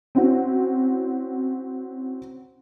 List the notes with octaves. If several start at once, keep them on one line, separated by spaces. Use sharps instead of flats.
C4 C#4 E4 F#4